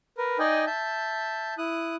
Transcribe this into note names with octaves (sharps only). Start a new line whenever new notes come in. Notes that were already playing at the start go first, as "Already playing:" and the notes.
A#4 B4
D#4 D5 D#5 G5 G#5
E5 A5 G6
E4 D#6 F#6